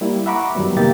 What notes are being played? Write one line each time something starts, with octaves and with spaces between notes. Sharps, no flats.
G3 A#3 E4
E5 F#5 A#5 B5 C#6 D6
F#2 D#3 F#3 G3 B3
C3 A#3 D#4 G4 E5 A6